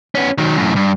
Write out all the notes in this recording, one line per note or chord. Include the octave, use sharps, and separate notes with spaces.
B3 C#4
D#3 F#3
F#2 A2
G2